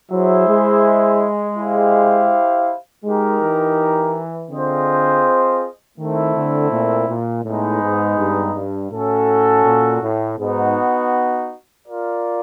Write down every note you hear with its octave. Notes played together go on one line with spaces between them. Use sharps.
F#3 E4 G#4 C5 E5
G#3
E4 G4 C5 F5
G#3 D#4 G4 A#4
E3
D3 C4 F4 G#4 C5 D#5
D#3 A3 C4 E4
D3
A#2
A#2
A2 G#3 B3 D#4
G#2
G2
G2
A2 C#4 F#4 A4
A#2
A2
G#2 B3 D#4 F#4
F4 A#4 D5